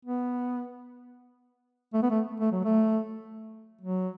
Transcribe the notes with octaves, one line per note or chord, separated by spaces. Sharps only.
B3
A3
B3
A3
A3
F#3
A3
F#3